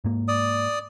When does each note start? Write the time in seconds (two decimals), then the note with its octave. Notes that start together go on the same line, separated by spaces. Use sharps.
0.04 G#2 A#3
0.28 D5 D#6